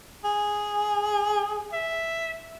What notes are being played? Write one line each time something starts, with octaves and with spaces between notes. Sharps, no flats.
G#4
E5